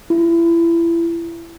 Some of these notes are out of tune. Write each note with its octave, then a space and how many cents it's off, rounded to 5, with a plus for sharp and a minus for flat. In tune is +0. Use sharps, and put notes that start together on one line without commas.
E4 +30